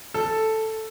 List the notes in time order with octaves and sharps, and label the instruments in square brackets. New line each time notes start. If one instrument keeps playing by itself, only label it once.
[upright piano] A4